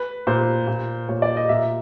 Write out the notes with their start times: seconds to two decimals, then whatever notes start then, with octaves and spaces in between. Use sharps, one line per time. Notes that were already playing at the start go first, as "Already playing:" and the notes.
Already playing: B4
0.27 A#2 C5
0.68 A#2
1.08 A#2 C#5
1.22 D5
1.37 D#5
1.49 A#2 E5